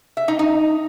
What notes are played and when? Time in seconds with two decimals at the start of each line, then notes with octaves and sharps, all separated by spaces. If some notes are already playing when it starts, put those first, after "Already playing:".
0.17 E5
0.28 D#4
0.39 D#4